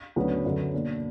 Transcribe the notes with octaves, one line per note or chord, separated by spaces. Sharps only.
D2 C#3 F#3 B3 D4 B4
F#2 D3 F#3
B2 A#3 D4